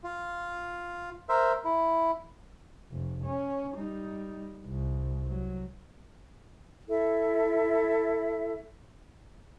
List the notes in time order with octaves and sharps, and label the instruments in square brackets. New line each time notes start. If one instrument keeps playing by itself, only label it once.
[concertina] F4
A#4 C5 E5
E4
[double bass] F1
C#4
G3 D#4
C2
F#3
[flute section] E4 A4 E5